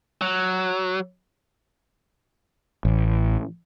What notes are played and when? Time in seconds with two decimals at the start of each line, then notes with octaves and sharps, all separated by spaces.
0.21 F#3
2.85 A1